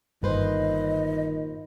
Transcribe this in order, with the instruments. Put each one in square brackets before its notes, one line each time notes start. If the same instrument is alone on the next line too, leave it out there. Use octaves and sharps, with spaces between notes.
[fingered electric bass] G1 G2 [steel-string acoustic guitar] A#2 B4 C5 [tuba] D#3 [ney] D#5